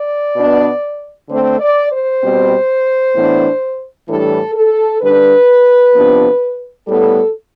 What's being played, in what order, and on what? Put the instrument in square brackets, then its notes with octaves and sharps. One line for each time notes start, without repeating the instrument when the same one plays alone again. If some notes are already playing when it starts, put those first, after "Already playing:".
Already playing: [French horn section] D5
B2 B3 D4
D3 A3 C4 C5
D5
C5
B2 G3 C4
A2 E3 B3 D4
A2 E3 G3 D4 A4
A4
D3 G3 D4 B4
C3 F3 B3 D4
A2 G3 B3 A4